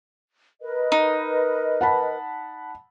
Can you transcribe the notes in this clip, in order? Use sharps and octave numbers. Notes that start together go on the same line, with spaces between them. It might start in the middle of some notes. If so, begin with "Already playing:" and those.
A#4 B4 D#5
D#4
F#5 A5 B5